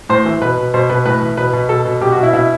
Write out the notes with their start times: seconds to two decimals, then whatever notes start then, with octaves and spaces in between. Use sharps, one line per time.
0.09 A2 C5
0.26 E3
0.41 B2 B4
0.57 B2
0.74 B2 C5
0.89 B2 B4
1.06 A2 B4
1.21 E3
1.37 B2 B4
1.53 B2
1.69 B2 A4
1.85 B2
2.01 B2 G4
2.12 F#4
2.17 B2
2.23 E4
2.33 B2 E4